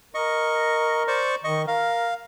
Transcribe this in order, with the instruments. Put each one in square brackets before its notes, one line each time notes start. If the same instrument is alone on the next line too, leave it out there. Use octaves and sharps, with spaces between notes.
[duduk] A#4 [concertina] D#5 C#6
[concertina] C5 D5 C#6
[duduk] D#3 [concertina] D#5 C#6
[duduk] A#4 [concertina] F5